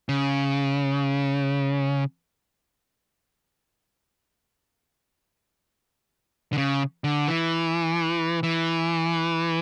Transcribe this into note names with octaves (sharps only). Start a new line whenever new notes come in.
C#3
D3
C#3
D3
E3
E3